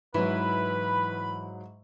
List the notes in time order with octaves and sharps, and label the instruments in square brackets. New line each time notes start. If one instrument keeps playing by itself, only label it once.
[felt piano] G#2 F#3 [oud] E3 [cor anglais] B4 [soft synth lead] B5